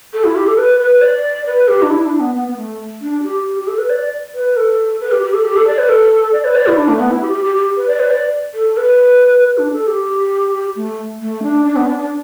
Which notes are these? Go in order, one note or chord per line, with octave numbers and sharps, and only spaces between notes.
A4
E4
G4
A4
B4
B4
D5
B4
G4
D4
E4
D4
B3
B3
B3
A3
D4
G4
G4
A4
B4
D5
D5
B4
A4
B4
G4
G4
A4
G4
A4
D5
B4
A4
D5
B4
D5
E4
D4
A3
B3
E4
G4
G4
G4
G4
B4
D5
B4
D5
A4
B4
B4
D4
A4
G4
A3
A3
D4
D4
B3
D4
D4